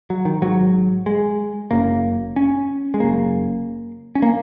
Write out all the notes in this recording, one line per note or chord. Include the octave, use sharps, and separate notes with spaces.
F#3
D#3
G#1 G#2 F#3
G#3
F#1 F#2 C#3 A#3
C#4
G#3
F#1 F#2 C#3 A#3
C#4
A#3